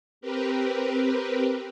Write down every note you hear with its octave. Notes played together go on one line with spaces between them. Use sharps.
C4 G4 A#4 B4